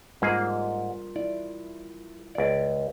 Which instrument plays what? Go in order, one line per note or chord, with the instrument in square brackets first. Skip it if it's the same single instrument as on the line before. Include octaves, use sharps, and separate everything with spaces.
[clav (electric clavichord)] G#2 A#3 G#4 [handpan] G3 F4 A#4
[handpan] E4 [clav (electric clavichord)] D5
[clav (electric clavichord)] C#2 D5